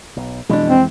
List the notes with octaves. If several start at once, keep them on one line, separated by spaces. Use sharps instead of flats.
B1
F2 B2 E3 G#3 D4
C4